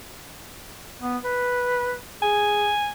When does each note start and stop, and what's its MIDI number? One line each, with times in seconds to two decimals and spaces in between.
1.01 1.18 59
1.24 1.94 71
2.22 2.69 68
2.22 2.90 80